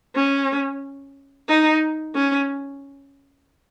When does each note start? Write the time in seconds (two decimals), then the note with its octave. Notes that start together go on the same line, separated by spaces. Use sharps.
0.15 C#4
1.49 D#4
2.15 C#4